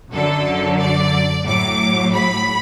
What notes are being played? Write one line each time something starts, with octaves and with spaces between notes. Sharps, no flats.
F#2 D3 F#3 A4
D5
A2 F#3 D6
B5